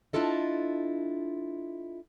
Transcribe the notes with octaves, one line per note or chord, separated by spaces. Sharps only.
D4 E4 F4 A4 D#5